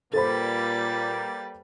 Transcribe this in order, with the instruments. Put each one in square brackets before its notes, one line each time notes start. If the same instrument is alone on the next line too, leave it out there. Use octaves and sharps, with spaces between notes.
[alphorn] A#2 [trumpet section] G3 A#3 [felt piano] A4 C5 B5 [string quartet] B4 A6